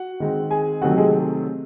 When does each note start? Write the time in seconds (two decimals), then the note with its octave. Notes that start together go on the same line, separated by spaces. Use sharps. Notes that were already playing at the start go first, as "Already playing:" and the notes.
Already playing: F#4 F#5
0.20 D#3 G#3 C4
0.50 G#4 G#5
0.82 C3 D#3 F#3 A3 C4 F#4 F#5
0.97 G#3 G#4